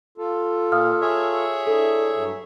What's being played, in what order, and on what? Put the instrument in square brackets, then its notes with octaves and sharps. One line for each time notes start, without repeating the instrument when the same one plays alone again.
[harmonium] F4 A4
[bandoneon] A#2 [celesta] F5 D#6 F6
[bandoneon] G#4 C#5 E5
[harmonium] D4 E4 [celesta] A4
[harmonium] G2 F#3